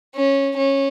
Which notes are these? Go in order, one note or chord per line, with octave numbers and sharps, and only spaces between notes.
C#4
C#4